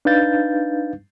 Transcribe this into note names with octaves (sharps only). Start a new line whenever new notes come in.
D4 D#4 B4 F5 G6 A6